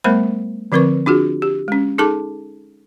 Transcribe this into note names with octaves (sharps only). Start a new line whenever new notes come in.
G3 A3 B3 A#4 C5 B5
D3 F3 C4 A#4 B4 C#6
D4 F4 F#4 G#4
G4
G#3 C#4
D#4 G#4 A4 A5 D6